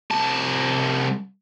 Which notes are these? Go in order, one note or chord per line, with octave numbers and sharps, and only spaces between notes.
C2 A5